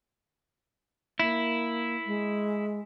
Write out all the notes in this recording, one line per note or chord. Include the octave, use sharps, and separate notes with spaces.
A#3 E4
G#3